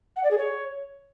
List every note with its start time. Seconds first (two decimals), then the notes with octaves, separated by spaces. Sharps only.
0.16 F#5
0.23 D5
0.31 G#4
0.38 C#5